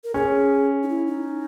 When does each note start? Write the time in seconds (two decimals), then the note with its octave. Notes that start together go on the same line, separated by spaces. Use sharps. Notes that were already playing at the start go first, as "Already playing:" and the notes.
0.04 A#4
0.14 C#4 G#4
0.83 D#4
0.89 E4
1.07 D#4